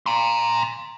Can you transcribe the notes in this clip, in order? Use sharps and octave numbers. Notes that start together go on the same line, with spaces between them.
A#5 C6